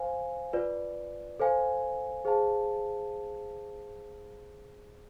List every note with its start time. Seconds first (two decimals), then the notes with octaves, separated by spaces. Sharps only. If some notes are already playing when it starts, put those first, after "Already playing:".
Already playing: C5 F5 G#5
0.53 F4 B4 D5
1.40 A4 C5 F5 G#5
2.25 G#4 C5 F5 A5